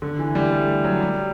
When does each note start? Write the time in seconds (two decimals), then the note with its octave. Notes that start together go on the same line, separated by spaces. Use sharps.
0.02 D3
0.19 E3
0.35 G3
0.52 A3
0.84 F#3
1.00 G3